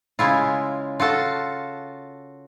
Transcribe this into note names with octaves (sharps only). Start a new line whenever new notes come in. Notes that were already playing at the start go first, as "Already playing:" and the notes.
C#3 G#3 E4 F4
F4 F#4 A4 A5